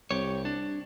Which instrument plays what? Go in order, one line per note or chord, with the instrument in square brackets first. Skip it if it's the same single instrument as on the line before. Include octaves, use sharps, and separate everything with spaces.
[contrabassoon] C2 [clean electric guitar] G4 C#5
[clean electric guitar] D4